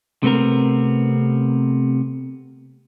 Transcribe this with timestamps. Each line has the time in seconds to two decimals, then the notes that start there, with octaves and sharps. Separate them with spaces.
0.23 C3 A3 B3 C4 A#4